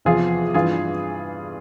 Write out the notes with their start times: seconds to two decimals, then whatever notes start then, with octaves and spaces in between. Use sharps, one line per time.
0.05 E2 C3 F3 F4 G#4
0.54 G2 E3 F4 G#4